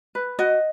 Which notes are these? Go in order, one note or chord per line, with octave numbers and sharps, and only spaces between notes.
B4
F#4 D#5